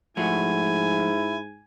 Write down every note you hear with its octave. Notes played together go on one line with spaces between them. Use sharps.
G#2 F3 A3 E4 F#4 G#5